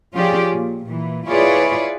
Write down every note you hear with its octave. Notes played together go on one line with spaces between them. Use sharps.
F3 C#4 F4 G4 G#4 D5
A#2
A#2 E3
E4 F4 G#4 B4 C#5 D5